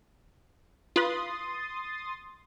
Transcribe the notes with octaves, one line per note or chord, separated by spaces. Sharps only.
F4 B4 C6 D#6 A6